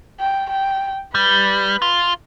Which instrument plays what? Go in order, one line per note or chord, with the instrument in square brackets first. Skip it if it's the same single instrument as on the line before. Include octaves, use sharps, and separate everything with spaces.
[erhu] G5
G5
[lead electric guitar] G3 [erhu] B4
[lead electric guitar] F4